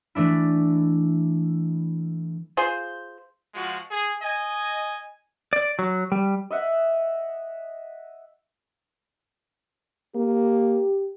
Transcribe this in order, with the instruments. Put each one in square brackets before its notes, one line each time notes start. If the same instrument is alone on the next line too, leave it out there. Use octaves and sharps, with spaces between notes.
[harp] E3 A3 D4 E4
[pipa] F4 G#4 C5
[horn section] F3 G#3 F4 F#4
G#4
D#5 G#5
[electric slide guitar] D5
F#3
G3
[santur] D#5 E5 F#5
[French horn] A#3 [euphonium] G4